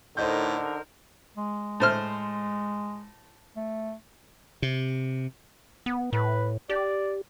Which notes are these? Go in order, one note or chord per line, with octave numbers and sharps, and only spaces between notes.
A2 D3 D#4 A#4 C5 D#5 G6
G#3
A2 C5 F6
A3
C3
B3
A2 B4
G4 D5